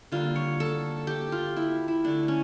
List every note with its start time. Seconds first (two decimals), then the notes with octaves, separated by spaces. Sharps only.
0.12 D3 G3 A#3 F4
0.36 C#5
0.60 A4
1.07 G4
1.32 F4
1.56 E4
1.88 E4
2.04 D3 A3 D4
2.28 C#4